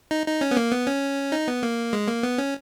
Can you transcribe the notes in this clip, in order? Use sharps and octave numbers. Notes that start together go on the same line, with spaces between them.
D#4
D#4
C#4
B3
A#3
B3
C#4
D#4
B3
A#3
G#3
A#3
B3
C#4